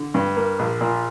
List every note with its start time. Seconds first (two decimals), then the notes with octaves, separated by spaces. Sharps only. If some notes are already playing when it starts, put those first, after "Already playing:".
Already playing: D3
0.14 G2
0.36 A#3
0.59 A#1
0.81 A#2